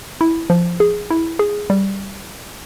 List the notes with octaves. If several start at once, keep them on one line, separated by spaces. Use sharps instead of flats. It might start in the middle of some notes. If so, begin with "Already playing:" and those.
E4
F3
G#4
E4
G#4
G3